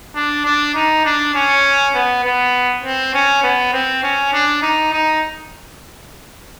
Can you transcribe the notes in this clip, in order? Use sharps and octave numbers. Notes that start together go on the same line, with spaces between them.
D4
D4
D#4
D4
C#4
B3
B3
C4
C#4
B3
C4
C#4
D4
D#4
D#4